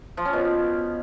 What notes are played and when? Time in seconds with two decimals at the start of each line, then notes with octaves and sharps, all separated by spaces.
0.17 F3
0.25 C#4
0.33 B2